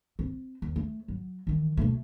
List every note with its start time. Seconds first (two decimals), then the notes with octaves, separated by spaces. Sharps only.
0.19 C4
0.62 D#2
0.76 A3
1.08 F#3
1.47 D#3 E3
1.77 B2 A3